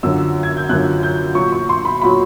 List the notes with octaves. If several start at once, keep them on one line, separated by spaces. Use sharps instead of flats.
F#2 D3 F3 E6
G#6
G6
F#2 D3 F3 F#6
G6
A#2 F#3 C#6
C#6
C6
B5
A#2 F#3 B5